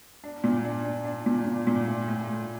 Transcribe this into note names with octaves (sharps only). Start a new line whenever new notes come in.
D4
A#2
D4
D4
D4
A#2
A#2
A#2
A2
A2
A2